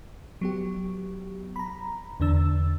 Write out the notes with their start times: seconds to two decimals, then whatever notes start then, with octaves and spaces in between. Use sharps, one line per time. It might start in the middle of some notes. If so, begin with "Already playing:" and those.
0.41 F#3 B3 G4
1.56 A#5 B5
2.20 E2 D3 D4 E6 A6